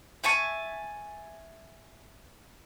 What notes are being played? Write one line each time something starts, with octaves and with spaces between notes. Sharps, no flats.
E5 G#5 A5 C#6